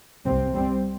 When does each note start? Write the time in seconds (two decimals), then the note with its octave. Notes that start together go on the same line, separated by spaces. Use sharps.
0.25 C3 G3 C4
0.30 C2
0.54 G3 C4